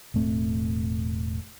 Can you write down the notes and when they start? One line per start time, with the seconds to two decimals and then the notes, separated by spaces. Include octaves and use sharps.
0.14 E1 A2 A3 C4